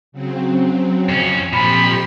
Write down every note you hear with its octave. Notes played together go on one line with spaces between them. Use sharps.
C#3 F#3 C4
F2 C#4
F2 A#2 F3 G4 B5 C6